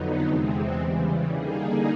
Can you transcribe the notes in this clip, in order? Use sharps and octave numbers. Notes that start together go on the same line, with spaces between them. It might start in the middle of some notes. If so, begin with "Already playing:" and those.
Already playing: F2 D3 F#3 B3 D#4
E2 C3 E3 G#3 C4
C#3 E3 G3
D3 G3 A#3 D#4 G#4